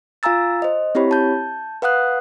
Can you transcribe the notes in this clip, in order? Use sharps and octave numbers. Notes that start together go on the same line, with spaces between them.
F4 F5 G#5 A#5 E6 A6
C5 D#5
C4 E4 G4 C#5 B5
A5 G6
B4 F5 F#5 D#6 F#6